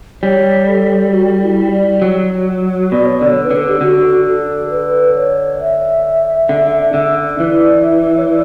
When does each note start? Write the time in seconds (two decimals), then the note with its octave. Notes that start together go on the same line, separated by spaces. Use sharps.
0.22 G3 C#5
0.68 A4
1.12 F#4
1.43 E4
1.72 D5
2.02 F#3
2.92 B2 D5
3.05 C#5
3.19 D3 D5
3.30 C#5
3.43 B4
3.51 D3
3.56 A4
3.68 G4
3.81 D3 F#4
4.26 A4
4.71 B4
5.16 C#5
5.61 E5
6.49 D3
6.94 D3
7.39 E3 D5
7.83 E5
8.17 C#5
8.28 D5